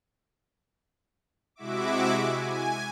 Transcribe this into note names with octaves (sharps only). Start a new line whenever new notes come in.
C3 G#3 E4 F#4 E5 D6
G#5